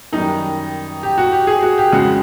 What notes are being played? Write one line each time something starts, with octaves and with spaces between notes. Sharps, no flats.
F#2 D#3 G3 D#4
G4
F#4
G4
G#4
F#4
G4
F2 C#3 F3 G#3 F#4